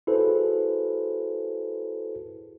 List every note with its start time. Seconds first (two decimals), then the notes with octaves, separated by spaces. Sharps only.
0.07 E4 F#4 G#4 A4 B4 C5